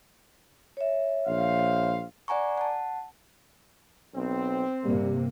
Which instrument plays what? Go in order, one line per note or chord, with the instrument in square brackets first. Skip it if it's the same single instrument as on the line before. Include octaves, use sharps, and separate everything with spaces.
[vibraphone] C#5 E5
[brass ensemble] A#1 C5 F5
[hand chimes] D5 F#5 G#5 A#5 C#6
F#5 A5
[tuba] B1 [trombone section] C4
[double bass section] G2 C3 A#3 [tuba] G3